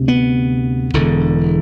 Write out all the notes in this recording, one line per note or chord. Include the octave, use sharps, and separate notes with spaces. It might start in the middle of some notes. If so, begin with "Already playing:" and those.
Already playing: D2 C3
B3
E1 E2 D3